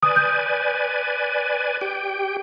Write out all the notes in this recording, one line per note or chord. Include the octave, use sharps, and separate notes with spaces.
B4 D5 G#5 D#6
G6
G4 G5